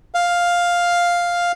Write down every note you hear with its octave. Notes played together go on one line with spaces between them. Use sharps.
F5